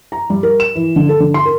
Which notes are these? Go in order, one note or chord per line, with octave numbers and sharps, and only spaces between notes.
A#5
G3
A#4
E7
E3
D3
A4
D3
C6
A#4